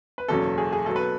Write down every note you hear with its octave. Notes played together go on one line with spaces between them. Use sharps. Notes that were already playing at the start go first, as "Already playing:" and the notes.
B4
F#1 E2 B2 F#3 C#4 A4
G#4
G#4
B1 B2 F#3 B3 A4
B4